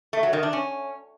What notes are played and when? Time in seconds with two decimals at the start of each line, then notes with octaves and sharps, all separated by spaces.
0.13 A3
0.23 F#3
0.33 D#3
0.43 D4
0.53 C#4